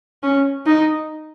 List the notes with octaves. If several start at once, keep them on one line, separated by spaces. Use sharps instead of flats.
C#4
D#4